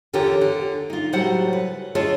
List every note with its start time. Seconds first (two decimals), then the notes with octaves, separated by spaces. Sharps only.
0.13 E2 D3 C#4 F4 G4 A#4
0.41 D3
0.90 D#4 F4
1.13 A2 C#3 F#3 G3 C5 F#5
1.53 B4
1.95 D2 F4 G#4 C#5 D#5 A5